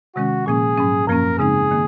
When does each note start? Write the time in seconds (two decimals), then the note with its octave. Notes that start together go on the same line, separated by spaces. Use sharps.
0.16 C3 D#3 G#3 C#4 F#4
0.46 A#2 F3 A#3 C#4 G#4
0.77 G#2 F#3 C#4
1.07 F#2 F3 A#3 C#4 A#4
1.39 C#3 G#3 C4 D#4 G#4
1.71 D#3 A#3